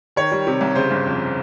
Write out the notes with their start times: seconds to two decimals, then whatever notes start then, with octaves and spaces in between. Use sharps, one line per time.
0.16 D#3 C#5
0.31 G3
0.47 C3
0.61 C2
0.75 C#3 C5
0.91 G1
1.06 F2